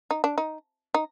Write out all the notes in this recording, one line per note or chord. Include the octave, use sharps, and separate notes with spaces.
D#4
D4
D#4
D#4